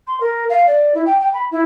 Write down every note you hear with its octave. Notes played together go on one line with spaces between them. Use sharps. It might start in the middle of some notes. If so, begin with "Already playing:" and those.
C6
A#4
F5
D5
E4
G5
G5
B5
E4